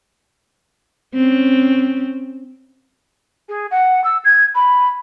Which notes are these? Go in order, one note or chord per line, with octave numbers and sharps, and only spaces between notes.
C4 C#4
G#4
F#5
E6
G#6
B5